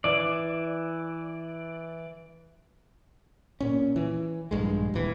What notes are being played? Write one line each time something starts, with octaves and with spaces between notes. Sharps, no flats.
E3 D5
A#2 C#4
E3
A#1 G2 G#3
D#1 E3